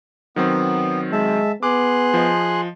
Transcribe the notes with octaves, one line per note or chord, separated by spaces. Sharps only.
D#3 F#3 B3 C4
G#3 E5 A5
B3 G#4 C6 D6 F#6
F3 D#5